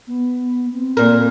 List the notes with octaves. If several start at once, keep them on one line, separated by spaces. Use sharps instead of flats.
B3
C4
A#2 A#4